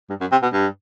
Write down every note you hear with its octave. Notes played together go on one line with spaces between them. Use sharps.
G2
F#2
C3
B2
G2